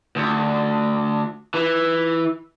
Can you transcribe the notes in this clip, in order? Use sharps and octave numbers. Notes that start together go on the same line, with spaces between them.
D2
E3